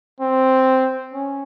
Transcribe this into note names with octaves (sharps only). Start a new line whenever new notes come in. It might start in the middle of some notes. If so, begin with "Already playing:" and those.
C4
C#4